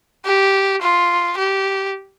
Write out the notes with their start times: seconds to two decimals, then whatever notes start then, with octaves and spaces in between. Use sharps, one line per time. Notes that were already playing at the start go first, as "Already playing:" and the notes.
0.25 G4
0.82 F4
1.38 G4